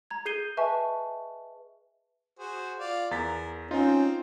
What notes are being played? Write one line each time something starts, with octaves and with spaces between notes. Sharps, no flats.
A#5 G#6
G#4 G6 C7 D#7 G7
B4 D#5 E5 G#5 A5 C#6
F#4 G#4 C5
F4 D5 F5
E2 A#4 A6 B6
C4 C#4 D#4 F4